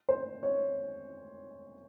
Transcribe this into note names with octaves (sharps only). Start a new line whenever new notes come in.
C5
C#5